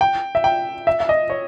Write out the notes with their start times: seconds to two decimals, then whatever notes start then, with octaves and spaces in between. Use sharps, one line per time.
0.01 G5
0.35 E5
0.44 G5
0.87 E5
1.00 E5
1.09 D#5
1.30 C#5